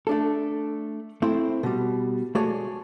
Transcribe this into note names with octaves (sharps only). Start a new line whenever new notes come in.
A3 D4 A4
A3 C4 E4 C5
B2 G3
G#3 A3 F#4 G#4 C#5 D5